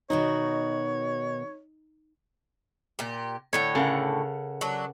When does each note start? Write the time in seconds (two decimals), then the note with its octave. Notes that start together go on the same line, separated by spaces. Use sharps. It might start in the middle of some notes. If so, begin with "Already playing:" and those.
0.10 B2 D#3 D#4 F#4 C#5
2.99 A#2 G4
3.53 A2 D3 C#5 G5
3.75 C#3 A4 A#4 F#5
4.61 F#3 D4